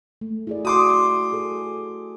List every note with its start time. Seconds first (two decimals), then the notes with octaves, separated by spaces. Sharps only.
0.21 A3
0.47 E4 G#4 D5
0.65 F#4 C6 D6 D#6
1.33 G#4 A4